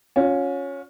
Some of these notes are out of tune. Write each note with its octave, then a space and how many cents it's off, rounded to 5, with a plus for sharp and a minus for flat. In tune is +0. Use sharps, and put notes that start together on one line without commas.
C#4 +0 F4 +40